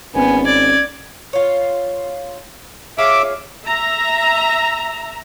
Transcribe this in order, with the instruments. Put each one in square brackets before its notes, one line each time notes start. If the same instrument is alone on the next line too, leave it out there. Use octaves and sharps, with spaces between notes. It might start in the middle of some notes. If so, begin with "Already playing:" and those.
[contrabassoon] G#1 [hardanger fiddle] B3 [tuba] C#4 [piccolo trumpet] G#5
[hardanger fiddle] D5 [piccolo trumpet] G#6
[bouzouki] F4 C#5
[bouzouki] F4 G#4 C#5 [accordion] E5 D6
[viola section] E5 A#5